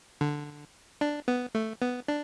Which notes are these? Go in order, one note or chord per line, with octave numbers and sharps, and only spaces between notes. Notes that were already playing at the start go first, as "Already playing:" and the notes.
D3
D4
B3
A3
B3
D4